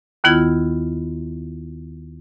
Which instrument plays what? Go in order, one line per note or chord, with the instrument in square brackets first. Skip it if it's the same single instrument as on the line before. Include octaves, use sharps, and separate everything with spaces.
[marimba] D#2 D#3 B3 E4 F4 G#6